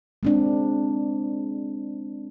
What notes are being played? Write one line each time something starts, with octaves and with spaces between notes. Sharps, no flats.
G#3 C4 D4